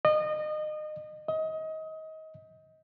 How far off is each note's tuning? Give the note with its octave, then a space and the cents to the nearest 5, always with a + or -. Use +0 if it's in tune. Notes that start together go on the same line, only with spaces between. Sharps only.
D#5 -30
D#5 +25